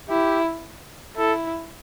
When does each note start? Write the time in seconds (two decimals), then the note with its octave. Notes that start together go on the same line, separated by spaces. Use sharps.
0.09 E4 G4
1.17 E4 A4